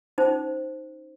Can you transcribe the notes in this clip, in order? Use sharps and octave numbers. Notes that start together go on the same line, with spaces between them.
C#4 D#4 C5